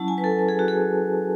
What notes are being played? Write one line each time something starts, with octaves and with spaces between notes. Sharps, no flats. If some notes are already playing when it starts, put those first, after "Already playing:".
Already playing: F#3 C#4 E4 A5
G#5
B4
A4
A4
G#4
F#4
G#4